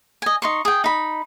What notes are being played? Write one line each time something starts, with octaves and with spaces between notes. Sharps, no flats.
D#5 G#5
D#4 C6 C#6
G#4 G5
D#4 B5